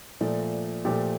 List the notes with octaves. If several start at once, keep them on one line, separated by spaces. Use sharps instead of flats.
A#2 F3 A3 D5
A#2 F3 A3 G4